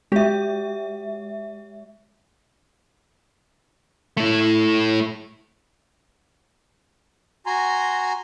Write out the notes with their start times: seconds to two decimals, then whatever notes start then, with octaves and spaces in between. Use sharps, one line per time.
0.12 G#3 F#4 G4 E5
4.17 A3 E4
7.46 F#4 G#5 A#5 C6